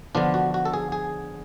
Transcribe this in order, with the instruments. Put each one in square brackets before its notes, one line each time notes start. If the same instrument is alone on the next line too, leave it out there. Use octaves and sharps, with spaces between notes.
[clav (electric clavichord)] D3 F3 B3 D4 F4
F#4
F#4
A4
G#4
G#4